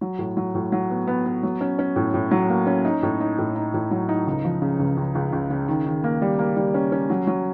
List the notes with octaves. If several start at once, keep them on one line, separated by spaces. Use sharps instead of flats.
F#3
A2
F#3
A2
F#3
B3
B3
B3
F#3
C#4
C#4
A2
A2
F#3
A#3
C#4
D#4
A2
D#4
A2
D#4
A2
F#3
D#4
C#2
F3
C#3
C#2
C#2
C#2
C#2
C#3
D#3
D#3
A#3
G3
A#3
G3
C#4
C#4
F#3
F#3